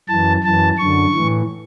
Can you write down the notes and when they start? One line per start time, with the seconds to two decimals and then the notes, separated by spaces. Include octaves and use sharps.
0.08 F#2 E3 A5
0.44 F#2 E3 A5
0.78 F#2 D3 C#6
1.14 A2 E3